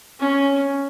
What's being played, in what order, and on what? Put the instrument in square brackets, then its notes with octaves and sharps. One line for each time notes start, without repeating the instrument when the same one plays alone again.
[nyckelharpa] C#4